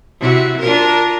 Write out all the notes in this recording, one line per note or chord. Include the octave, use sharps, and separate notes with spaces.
C3 E4 F#4
D4 F4 A#4